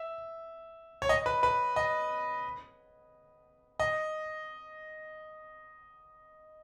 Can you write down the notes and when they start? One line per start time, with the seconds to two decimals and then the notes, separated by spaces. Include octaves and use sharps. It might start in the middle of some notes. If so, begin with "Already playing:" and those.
Already playing: E5
1.02 C#5
1.09 D#5
1.26 B4
1.43 B4
1.76 D#5
3.80 D#5